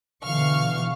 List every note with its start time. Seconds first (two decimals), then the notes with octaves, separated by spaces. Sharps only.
0.23 B2 D3 E3 F5 C#6 F6